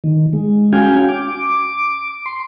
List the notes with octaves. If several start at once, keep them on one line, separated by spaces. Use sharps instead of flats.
D#3
G#3
C#4 F#4 F5 G5 G#5
D6
C6